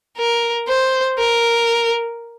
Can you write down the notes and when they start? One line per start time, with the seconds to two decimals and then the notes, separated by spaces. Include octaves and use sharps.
0.17 A#4
0.68 C5
1.18 A#4